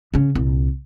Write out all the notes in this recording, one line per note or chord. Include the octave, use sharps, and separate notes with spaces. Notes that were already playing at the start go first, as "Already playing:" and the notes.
C#3 C#4
C2 A#2